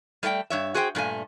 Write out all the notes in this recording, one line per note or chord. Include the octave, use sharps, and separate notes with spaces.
G3 A3 D5 F#5 G5
G2 C#5 E5
F#4 G#4 C5 E5 G5
G2 A#2 A3 G#5